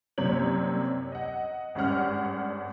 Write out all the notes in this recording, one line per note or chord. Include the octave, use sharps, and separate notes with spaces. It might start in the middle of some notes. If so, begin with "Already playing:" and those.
C2 F#2 C3 A#3 C#5 F#7
D#5 F#5
G#1 G2 C#4 F#5 F6